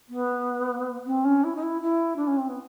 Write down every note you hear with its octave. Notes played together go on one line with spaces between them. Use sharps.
B3
C4
C#4
E4
D#4
E4
E4
D4
C#4
C4
B3